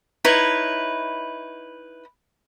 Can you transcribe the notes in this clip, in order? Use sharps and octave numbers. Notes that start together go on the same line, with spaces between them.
D#4 E4 B4 C#5